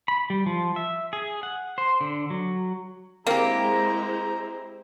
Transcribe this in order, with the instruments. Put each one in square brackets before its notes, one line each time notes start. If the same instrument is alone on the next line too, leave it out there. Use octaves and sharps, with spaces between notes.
[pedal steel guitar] B5
G3
F3
E5
G#4
F#5
C5
D3
F#3
[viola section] G#3 E4 C5 [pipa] A#3 [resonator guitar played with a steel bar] C4 G4 [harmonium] A#5